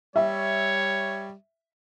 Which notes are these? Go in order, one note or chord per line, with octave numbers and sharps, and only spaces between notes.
G3 C#5 E5